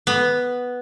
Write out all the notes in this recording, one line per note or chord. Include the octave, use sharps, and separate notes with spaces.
B3